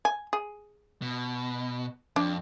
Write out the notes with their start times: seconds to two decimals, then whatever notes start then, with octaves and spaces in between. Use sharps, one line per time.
0.05 G#5
0.33 G#4
1.02 B2
2.16 F2 D4